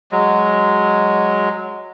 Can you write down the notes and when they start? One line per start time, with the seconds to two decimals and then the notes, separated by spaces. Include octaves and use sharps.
0.12 F#3 G#3